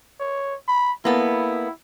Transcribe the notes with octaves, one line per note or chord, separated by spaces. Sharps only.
C#5
B5
A#3 B3 E4 A4